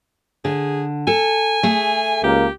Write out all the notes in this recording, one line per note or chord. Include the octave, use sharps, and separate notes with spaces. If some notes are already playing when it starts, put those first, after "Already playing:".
D3 G#4
A4 G#5
A3 G#4
C#2 A#3 G4